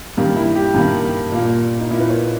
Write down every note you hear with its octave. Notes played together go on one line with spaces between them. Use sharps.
G2 D#3 G3 A#3 G4
E4
G4
G2 D#3 G3 A#3
A#2 A#3
D#4
A#2 A#3 E4
B4
C#5